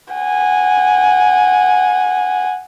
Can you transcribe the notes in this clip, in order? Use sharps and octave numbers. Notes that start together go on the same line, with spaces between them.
F#5 G#5